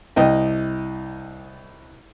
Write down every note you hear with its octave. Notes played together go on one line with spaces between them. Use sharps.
C2 D#5 G5